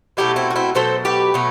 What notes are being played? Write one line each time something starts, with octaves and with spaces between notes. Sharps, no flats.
B2 F#3 A3 E4 G4
C4 E4
F#4
C4 E4
B2 F#3 A3 A4 C5
G4 B4
B2 F#3 A3